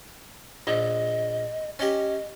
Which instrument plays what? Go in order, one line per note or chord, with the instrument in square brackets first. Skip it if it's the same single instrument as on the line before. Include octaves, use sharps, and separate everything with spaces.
[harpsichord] A#1 [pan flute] D#5
[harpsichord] C#4 G4 [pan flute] D#5